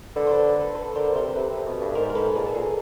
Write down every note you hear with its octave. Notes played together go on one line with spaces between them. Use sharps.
D3 A4 B4
C5
A4 B4
A4 B4
A4 B4
D3 A#4 C5
C3 A#4 C5
C3 A4 B4
C3
B2
G2
G#2 A#4 C5
A#4
G#2 A4 B4
A#2 G#4 A#4
A4
A#2 G#4